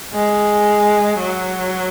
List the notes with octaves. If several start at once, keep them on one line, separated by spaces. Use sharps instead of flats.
G#3
F#3